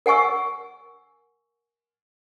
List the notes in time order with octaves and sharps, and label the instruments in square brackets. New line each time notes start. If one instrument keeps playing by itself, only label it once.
[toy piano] A#4 F#5 G#5 C#6 E6